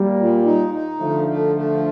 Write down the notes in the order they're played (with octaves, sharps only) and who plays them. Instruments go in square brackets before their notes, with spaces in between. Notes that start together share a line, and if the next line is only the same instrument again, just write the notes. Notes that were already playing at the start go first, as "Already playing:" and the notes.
Already playing: [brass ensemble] G3 A#3
[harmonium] A#2
D#4
D#4
[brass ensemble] D3 F3 [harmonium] A3
[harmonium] A3
A3